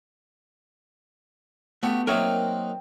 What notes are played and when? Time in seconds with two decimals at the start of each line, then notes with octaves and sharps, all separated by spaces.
1.83 A3 B3 F#4 G4
2.07 F#3 A#3 C4 D#4 A#4 C#5 E5